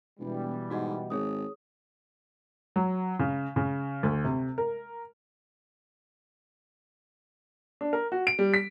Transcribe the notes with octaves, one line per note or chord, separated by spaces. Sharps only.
E1 B2 E3 G3
G#2 F#4 D#5 F#5
G#1 G#4 C#5 D#6
F#3
C#3
C#3
D2
C3
A#4
D4
A#4
F#4
D7
G3
B6